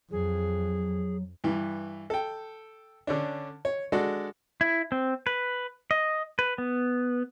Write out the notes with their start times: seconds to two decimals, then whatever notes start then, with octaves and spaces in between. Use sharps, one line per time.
0.11 F2 F#3 G#4
1.44 G2 E3
2.10 A4 G5
3.07 D3 C#4 D4
3.65 C#5
3.92 G#3 D4 F#4 A4
4.61 E4
4.92 C4
5.27 B4
5.91 D#5
6.39 B4
6.58 B3